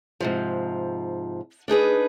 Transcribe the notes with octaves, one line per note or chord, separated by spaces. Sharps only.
G#2 C3 F3
D4 D#4 G#4 B4